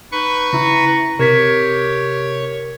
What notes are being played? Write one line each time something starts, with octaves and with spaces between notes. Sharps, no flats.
D#4 B4 C#6
C#3 E4 A#5
C3 G4 A#4 C#5 G#6 B6